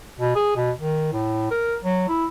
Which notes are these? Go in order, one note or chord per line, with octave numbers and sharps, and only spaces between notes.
B2
G#4
B2
D#3
A2
A#4
F#3
E4